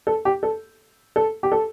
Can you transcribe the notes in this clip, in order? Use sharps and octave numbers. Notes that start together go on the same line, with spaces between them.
A4
G4
A4
A4
G4
A4